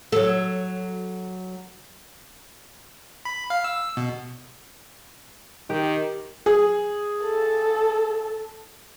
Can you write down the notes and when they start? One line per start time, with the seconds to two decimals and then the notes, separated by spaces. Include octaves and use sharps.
0.12 F#3 A4
3.25 B5
3.50 F5
3.64 E6
3.97 B2
5.70 D#3 G4
6.46 G#4
7.23 A4